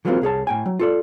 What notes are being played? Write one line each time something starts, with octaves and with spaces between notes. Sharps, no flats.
E3 F#3 G#3 A#3 C4 F4
C2 G#4 C#5 A5
A2 G5 G#5
F#3
F4 A4 D5